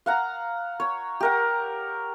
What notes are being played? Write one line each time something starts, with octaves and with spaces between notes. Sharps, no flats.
F5 F#5 A#5
C#5
G4 A#4 F#5